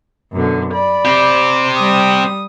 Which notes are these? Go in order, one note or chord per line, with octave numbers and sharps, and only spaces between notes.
F#2 B2 D3
D5 B5
C4 G4
G3 D#6